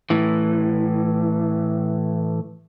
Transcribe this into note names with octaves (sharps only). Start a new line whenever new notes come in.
A2 E3